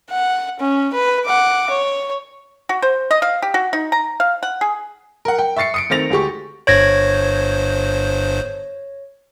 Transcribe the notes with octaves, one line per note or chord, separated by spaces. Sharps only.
F#5
C#4
B4
F#5 D6
C#5
F#4
C5
D#5
F5
G4
F#4
D#4
A#5
F5
F#5
G#4
A#4 F#5
G5
E5 C#6 A6 C7 C#7
D#6 C#7 D7
D#3 A3 C4 A6 A#6 F7
D2 G#3 G4 C#6
G1 G2 C5 C#5 G#6 A#6